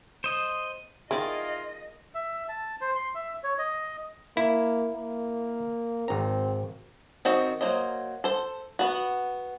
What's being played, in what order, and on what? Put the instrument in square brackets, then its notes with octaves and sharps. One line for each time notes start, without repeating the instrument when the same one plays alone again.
[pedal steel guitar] C5 D#5
[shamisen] D#3 E4 [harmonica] F4 [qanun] G#4 A#4 D5 [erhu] D#5
[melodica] E5
A5
C5
C6
E5
C#5
D#5
[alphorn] A#3 [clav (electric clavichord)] E4
[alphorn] A#3
[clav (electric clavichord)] G#1 A#5 [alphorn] C4
[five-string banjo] D#3 C4 F#4 D#5
F#3 A#3 C5 D#5
A4 C5
B3 F#4